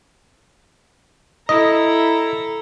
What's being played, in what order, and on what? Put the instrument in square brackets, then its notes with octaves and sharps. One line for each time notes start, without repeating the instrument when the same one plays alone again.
[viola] E4 [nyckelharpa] A4 A#5 [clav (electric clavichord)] D#5